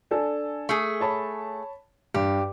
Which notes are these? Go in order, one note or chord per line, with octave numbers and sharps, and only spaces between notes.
D4 A4 G#5
A3 G#4
C#5 A5 B5
G2 G4